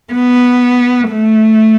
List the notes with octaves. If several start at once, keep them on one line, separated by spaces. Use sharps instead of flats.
B3
A3